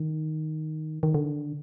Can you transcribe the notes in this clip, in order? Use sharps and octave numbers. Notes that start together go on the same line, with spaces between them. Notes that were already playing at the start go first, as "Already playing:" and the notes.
Already playing: D#3
D#3
D3